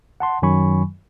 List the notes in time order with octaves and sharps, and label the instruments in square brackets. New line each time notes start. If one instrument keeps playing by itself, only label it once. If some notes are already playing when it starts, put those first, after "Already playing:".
[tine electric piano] F#5 A5 C6
F#2 D#3 F#3 G#5 B5 C#6